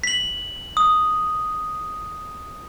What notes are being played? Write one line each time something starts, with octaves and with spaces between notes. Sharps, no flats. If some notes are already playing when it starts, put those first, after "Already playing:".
B6 F#7
D#6